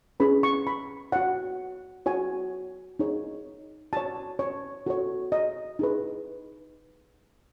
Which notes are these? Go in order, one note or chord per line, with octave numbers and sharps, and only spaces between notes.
C#4 G#4 B4 B5
C#6
B5
F#4 C#5 F#5
F#4 C#5 G#5
D#4 G#4 C#5
F#4 C#5 A5
C#5
F#4 A4 C#5
D#5
D#4 G#4 B4